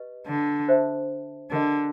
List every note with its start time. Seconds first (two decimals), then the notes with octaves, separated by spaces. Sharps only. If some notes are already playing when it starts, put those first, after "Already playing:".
Already playing: G4 B4 D#5
0.27 D3
0.68 C5 E5 A5
1.51 D3 G4 A#4 D#5